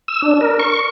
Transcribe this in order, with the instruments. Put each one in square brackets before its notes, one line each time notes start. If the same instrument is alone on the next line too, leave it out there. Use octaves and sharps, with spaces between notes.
[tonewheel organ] E6
D4
A#4
C#6